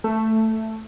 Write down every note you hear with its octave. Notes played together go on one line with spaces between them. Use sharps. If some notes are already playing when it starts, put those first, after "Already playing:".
A3